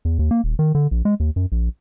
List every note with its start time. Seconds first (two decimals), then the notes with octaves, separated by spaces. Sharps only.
0.05 E2
0.19 D#2
0.31 A#3
0.44 D#1
0.59 D#3
0.75 D3
0.91 A#1
1.05 G#3
1.20 D#2
1.36 F#2
1.52 A#1